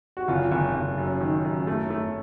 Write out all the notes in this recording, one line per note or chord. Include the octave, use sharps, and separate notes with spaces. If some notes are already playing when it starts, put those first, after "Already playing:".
F#4
F#1 F4
F#1
F#1
F#2
D#3
F#2
A3
A3